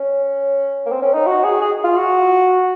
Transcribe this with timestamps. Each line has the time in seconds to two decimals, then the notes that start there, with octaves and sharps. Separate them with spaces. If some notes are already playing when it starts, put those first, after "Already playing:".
Already playing: C#4
0.86 A#3
0.91 C4
1.02 C#4
1.14 D#4
1.26 F#4
1.44 G#4
1.61 G#4
1.84 F4
1.96 F#4